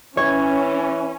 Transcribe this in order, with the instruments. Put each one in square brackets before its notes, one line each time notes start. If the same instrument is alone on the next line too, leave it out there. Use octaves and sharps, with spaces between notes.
[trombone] E3 [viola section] C#4 [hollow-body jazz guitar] C#5